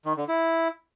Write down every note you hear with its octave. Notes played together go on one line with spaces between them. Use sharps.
D#3
D3
E4